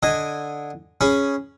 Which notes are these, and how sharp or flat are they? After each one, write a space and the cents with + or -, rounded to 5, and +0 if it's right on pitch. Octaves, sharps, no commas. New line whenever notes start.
D3 +0 D#5 +0 G#5 -10
C#4 +0 G#4 +0 B5 +5